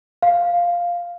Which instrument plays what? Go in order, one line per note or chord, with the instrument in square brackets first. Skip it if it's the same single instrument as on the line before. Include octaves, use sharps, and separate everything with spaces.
[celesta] F5